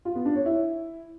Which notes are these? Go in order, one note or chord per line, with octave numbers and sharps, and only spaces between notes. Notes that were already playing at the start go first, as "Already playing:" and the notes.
F4
B3
D4
C#5
E4